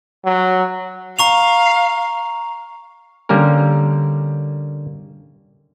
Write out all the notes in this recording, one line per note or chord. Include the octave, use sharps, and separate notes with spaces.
F#3
F5 A#5 C#6 F7
D3 G3 A#3 C#4 A#4